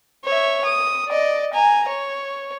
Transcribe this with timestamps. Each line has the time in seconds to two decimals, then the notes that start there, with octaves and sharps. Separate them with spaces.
0.24 C#5 E5
0.65 D#6
1.08 D5 D#5
1.54 G#5 A#5
1.88 C#5